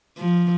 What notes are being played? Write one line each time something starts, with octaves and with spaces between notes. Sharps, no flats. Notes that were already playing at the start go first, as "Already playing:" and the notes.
F3